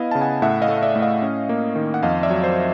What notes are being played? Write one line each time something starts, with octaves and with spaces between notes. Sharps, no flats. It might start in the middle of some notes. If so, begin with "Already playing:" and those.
Already playing: B3 E4 D#5 F5
C#3 A5
F#5 G#5
A2 E5 F#5
D#5 F5
A3
F5
D5 E5
A2
D#5 F5
C#4
A#3
D#3
F#5
F2 D#5 F5
D5 E5
F#3
C5 D5